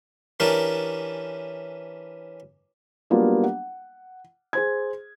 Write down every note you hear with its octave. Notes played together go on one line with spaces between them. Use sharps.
E3 C#4 D4 G4 A#4
F#3 G3 A#3 B3 D4 F4
F#5
G#4 C5 G#6